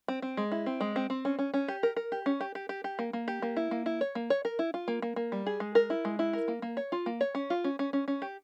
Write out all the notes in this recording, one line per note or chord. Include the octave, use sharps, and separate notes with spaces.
C4
C4
G#3
E4
C4
G#3
C4
C4
C#4
C#4
C#4
G4
A#4
A#4
G4
C#4
G4
G4
G4
G4
A#3
A#3
G4
A#3
E4
A#3
E4
C#5
A#3
C#5
A#4
E4
F4
A#3
A#3
A#3
G3
G#4
G#3
A#4
E4
G#3
E4
A#4
A#3
A#3
C#5
F4
A#3
C#5
C#4
F4
C#4
C#4
C#4
C#4
G4